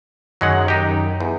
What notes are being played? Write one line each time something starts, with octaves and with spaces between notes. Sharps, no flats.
F#2 D#3 F#3 G#3 F#5
D#4 G4
E2